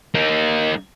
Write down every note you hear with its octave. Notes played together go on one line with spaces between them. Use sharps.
A#3 D#4